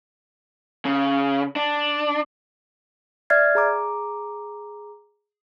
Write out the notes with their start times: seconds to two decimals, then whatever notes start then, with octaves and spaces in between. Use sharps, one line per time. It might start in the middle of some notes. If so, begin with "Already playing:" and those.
0.85 C#3
1.56 D4
3.30 D5 E5 F6 G#6 A6 C7
3.55 G#4 A#5 D6